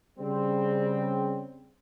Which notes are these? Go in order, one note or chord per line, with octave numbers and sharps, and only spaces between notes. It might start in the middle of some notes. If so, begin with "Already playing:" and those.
C#3 G3 C4